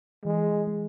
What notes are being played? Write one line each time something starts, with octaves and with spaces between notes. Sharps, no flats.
E3 G#3
G#3